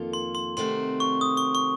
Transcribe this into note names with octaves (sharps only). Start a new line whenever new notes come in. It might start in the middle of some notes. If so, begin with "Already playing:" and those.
Already playing: F2 D#3 A#3 F4 A4
C6
C6
C3 D#3 A3 C4 F#4 C6
C#6
D#6
C#6
C#6